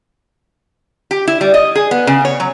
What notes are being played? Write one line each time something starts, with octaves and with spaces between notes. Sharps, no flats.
G4
E4
G3
D#5
G#4
B3
C#3
C#5
F#3